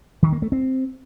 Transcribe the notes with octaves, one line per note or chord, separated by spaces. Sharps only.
D#3
A#3
A3
C4